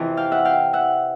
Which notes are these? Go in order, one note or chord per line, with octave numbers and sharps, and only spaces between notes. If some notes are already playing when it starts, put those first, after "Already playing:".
Already playing: F2 C3 E3
F5 G5
E5 F#5
F5 G5
E5 F#5